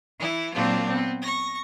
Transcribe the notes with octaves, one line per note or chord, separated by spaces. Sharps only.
E3 E4
A#2 F#3 A#3 C4 D4 F4
B3 C4
C#6 A#6